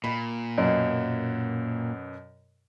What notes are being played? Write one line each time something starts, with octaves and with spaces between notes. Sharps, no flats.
A#2 B5
F#2 B2